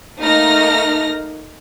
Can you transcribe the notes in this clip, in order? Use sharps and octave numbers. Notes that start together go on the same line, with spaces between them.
A3 A#3 D#4 F6 A#6